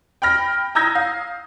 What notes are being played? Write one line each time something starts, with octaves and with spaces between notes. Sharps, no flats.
G5 B5 F6 A#6
A#5 D#6 E6 G6 G#6 A#6
F5